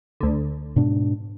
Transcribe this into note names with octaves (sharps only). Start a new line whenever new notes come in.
D2 D3
G#2 B2 D4